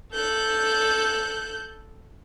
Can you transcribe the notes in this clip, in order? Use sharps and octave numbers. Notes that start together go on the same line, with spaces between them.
A4 F#6 G6